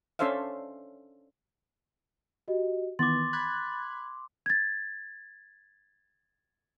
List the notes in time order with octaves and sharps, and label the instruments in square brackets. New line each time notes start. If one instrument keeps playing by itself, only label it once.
[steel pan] C#4 D4 A4 C5 E5 F5
[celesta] F#4 G4 D#5
[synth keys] D#3 E3 B3 [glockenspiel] C6 D6 [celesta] A6
[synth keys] B5 F#6 G#6
[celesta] G#6 A6